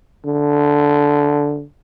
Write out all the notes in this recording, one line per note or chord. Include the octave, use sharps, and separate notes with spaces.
D3